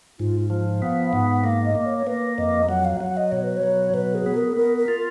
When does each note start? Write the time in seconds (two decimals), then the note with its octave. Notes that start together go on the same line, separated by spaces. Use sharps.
0.19 G#2 F4
0.40 F4
0.50 F3
0.82 B3 F5
1.13 G#2 F#5
1.44 A#3 F5
1.65 D#5
1.75 A#3
1.86 C#5
2.07 A#3 B4
2.38 F2 D#5
2.69 F#3 F#5
2.85 F5
3.00 F#3 F#5
3.17 D#5
3.32 B2 C#5
3.44 B4
3.57 C#5
3.63 F#3
3.94 B2 B4
4.15 G#4
4.26 B3
4.37 A#4
4.57 B3 A#4
4.77 A#4
4.88 F4